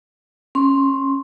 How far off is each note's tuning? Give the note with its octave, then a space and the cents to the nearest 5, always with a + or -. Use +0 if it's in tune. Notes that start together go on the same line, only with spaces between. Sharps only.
C#4 -15 C6 +0